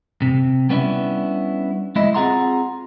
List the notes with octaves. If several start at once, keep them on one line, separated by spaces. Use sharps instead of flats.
C3
G3 B3 C#4 D4 E4
G#3 E4 D#5
C4 F4 G#4 F#5 A#5 C6